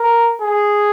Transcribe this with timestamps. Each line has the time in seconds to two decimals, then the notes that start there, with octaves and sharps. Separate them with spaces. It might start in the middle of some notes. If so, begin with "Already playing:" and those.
Already playing: A#4
0.42 G#4